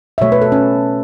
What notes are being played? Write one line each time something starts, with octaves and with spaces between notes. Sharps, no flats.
E5
B2 F#3 A3 C#5
B4
A4
C#4